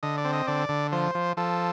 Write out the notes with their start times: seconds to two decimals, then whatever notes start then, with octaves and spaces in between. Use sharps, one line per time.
0.03 D3 D#5
0.18 D5
0.25 C4
0.33 D#5
0.47 D3 D5
0.69 D3
0.92 F3 C5
1.15 F3
1.37 F3 A4